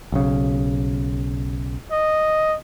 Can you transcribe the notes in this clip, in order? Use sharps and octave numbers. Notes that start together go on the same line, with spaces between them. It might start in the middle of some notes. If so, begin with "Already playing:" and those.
B1 C#3
D#5